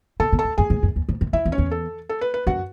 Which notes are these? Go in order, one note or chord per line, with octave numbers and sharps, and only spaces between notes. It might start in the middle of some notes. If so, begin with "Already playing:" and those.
B2 A4 A5
B2
A4 A5
E2
F#2 G#4 G#5
G#2
F#2
E2
G#2
F#2
F#2 E4 E5
E2
C#4 C#5
E2
A4
A4
B4
B4
F#2 F#4 F#5